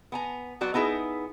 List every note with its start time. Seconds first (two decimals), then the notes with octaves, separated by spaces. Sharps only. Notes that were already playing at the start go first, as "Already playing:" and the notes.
0.12 B3 G#5 A#5
0.61 F#3 B3 F#4 D5
0.74 B3 D#4 E4 G#4